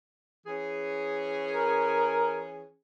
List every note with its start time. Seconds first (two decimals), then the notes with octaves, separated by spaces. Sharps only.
0.46 E3 C#4 G#4
1.54 A#4